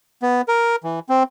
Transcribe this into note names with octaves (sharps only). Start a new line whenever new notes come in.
B3
A#4
E3
C4